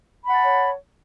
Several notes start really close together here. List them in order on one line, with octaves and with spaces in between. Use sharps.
B5 F#5 A5 C#5